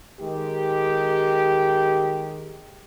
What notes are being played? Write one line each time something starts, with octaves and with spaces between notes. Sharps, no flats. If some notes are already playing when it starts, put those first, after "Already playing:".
D#3 G#3 G4